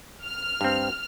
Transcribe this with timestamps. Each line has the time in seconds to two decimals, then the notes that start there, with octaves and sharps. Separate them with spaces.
0.24 F6
0.61 G2 C4